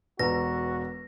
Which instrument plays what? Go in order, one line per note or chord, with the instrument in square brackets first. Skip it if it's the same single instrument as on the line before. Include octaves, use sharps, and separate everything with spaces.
[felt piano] E1 A#5 [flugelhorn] F#4 [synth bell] B4 [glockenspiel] A#6